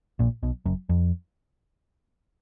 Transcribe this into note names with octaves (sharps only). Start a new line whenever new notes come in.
A#1 A#2
B1 B2
F#1 F#2
F2